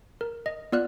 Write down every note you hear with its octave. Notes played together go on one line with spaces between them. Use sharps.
A#4
D#5
B3 F4 D5 F6 F#6